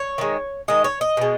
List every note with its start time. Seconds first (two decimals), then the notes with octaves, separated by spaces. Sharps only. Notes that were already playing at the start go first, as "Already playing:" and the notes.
Already playing: C#5
0.18 D#3 G#3
0.68 D#3 G#3 D#5
0.84 C#5
1.01 D#5
1.17 B2 G#3